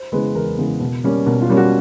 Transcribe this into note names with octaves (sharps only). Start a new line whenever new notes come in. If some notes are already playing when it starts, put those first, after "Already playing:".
Already playing: C5
C#3 E3 G#3 B3 B4
E2 A#4
C#3 E3 G#3 B3
B2
G3 A#3 C#4
B2 A#4
F4
G3 A#3 C#4
F#4